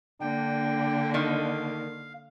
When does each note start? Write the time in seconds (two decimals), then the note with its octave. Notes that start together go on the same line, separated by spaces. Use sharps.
0.21 D3 A#3 D4 G5
1.14 D#3 F5